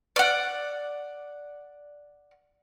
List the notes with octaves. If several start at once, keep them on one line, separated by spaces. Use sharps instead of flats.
D5 F#5